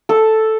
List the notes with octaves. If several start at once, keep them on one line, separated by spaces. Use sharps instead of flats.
A4